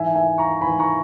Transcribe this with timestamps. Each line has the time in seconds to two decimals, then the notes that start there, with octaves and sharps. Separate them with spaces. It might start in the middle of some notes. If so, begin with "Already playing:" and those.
Already playing: G#2 E3 E5 G#5
0.15 E5 G#5
0.38 A#5 C#6
0.61 G#2 E3 G#5 B5
0.79 A#5 C#6